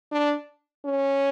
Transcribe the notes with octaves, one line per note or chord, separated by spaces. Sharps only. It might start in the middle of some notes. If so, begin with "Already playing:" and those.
D4
C#4